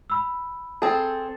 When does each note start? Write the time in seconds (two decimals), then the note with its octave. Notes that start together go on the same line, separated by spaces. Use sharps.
0.10 B5 E6
0.82 C4 G#4 A4